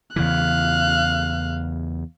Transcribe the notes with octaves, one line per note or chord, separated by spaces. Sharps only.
E2 C#3 E3 F5 F#6